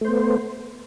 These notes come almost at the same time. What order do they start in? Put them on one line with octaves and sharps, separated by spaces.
A3 C5 B3